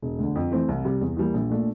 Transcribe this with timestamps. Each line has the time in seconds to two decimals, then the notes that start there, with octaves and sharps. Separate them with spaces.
0.02 E1
0.19 D2 D3
0.36 F2
0.52 E3 A3 C4
0.69 C2
0.85 C3 G3
1.01 E2
1.17 E3 G3 A#3
1.34 A#1
1.50 A#2 A3 D4